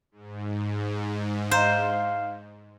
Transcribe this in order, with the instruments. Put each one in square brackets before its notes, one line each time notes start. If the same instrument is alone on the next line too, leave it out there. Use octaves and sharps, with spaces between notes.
[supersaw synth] G#2
[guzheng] C5 [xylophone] D#5 A#5 E7 [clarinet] F5